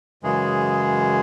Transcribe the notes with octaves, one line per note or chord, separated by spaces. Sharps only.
F#2 C#3 E3 G#3 G#4